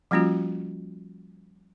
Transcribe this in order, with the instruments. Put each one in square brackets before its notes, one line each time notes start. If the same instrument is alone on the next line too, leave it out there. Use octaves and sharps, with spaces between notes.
[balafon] F3 G3 A#3 C#4 F4 F#4